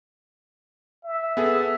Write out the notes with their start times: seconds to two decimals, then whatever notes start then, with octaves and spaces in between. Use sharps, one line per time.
1.03 E5
1.37 B3 G#4 A4